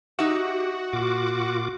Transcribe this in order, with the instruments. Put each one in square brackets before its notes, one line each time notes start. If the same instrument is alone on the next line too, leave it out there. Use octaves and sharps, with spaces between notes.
[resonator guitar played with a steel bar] D#4 E5 [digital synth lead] F#4 [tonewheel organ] G4
[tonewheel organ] A#2 F4 D6